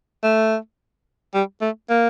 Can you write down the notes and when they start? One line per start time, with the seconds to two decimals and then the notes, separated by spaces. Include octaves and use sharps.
0.23 A3
1.34 G3
1.61 A3
1.90 A#3